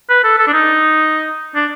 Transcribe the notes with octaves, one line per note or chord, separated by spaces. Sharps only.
B4
A4
A4
D4
D#4
D4